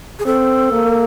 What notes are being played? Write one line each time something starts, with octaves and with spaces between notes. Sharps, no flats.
G#4
C4 A4
A#3